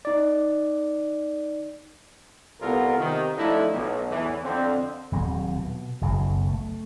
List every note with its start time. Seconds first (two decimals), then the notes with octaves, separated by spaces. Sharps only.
0.05 D#4 D5
2.61 C2 A#2 B3 F4 A4 A#4
2.98 C3 D#3
3.37 D3 F3 A3 D#4 E4
3.72 B1
4.09 E2 A2 E3
4.43 F2 D3 C4
5.12 D#1 F#3 C4
5.56 B2
6.01 F#1 B1 B2
6.49 A3